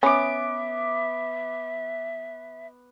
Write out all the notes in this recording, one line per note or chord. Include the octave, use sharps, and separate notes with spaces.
B3 C#4 E5 D6